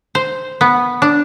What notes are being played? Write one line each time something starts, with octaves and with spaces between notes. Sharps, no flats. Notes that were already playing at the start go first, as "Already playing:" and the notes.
C5
B3
D4